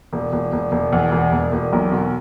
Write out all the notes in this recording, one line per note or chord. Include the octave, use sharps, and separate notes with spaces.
E1
E1
E1
E1
E2
E1
E1
E1
B1
B2